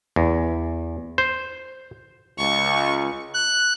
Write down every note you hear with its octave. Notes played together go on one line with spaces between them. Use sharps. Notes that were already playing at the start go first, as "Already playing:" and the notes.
E2
C5
C#2 C#6
F#6